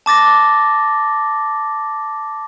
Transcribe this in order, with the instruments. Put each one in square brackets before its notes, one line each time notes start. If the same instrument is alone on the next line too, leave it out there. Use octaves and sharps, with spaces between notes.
[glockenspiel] A5 D6 A6 A#6